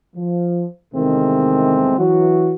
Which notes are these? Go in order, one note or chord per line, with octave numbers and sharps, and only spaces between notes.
F3
E2 C3 D#3 G#3 A3 C4
E3 F#3 F#4